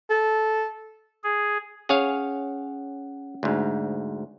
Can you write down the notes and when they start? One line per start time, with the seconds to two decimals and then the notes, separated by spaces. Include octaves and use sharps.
0.10 A4
1.23 G#4
1.89 C#4 G#4 C#5 F5 F#5
3.43 D2 G#2